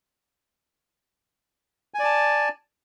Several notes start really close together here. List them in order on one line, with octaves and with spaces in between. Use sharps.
G#5 D5 A5